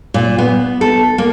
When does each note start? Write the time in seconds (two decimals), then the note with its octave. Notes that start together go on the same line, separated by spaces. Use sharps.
0.14 A#2
0.38 B3
0.81 A4
1.18 A#3